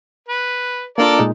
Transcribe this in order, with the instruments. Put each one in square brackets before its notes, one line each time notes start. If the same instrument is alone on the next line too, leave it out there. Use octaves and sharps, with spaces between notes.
[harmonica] B4
[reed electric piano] A#3 D4 F4 [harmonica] A4 A#4 D5
[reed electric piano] A#2 G#3 D#4